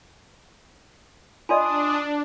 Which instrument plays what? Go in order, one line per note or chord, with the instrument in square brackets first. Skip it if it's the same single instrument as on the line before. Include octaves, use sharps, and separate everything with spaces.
[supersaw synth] D4 [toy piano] F4 D5 D#5 [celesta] G#5 C6 [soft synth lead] D#6